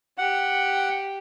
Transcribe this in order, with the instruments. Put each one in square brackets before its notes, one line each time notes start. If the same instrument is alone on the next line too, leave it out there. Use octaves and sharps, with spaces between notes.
[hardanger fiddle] G4 [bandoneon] F#5